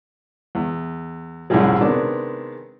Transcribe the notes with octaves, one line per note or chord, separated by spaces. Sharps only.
E2
C2 F#2 A2 F3 G3 G#3
C3 D#3 G#3 B3 D4